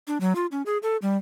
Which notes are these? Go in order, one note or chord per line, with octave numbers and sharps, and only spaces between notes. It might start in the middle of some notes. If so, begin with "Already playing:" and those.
D4
F#3
F4
C#4
G#4
A4
G3